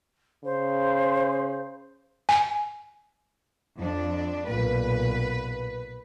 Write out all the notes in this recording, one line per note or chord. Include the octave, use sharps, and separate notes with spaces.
C#3 C5
G#5
F2 D4
B1 A#2 B4